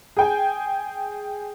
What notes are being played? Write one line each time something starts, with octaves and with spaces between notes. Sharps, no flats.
G#4 G5 G#5